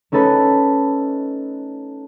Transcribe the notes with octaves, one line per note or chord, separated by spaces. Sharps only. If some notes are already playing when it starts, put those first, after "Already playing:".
A3 C#4 D#4 A4 B4